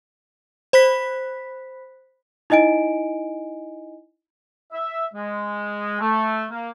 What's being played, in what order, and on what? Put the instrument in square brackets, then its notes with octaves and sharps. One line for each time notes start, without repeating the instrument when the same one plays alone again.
[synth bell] C5 B5 F#6 B6
[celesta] D#4 E4 D#5 G#5 D7
[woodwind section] E5
G#3
A3
A#3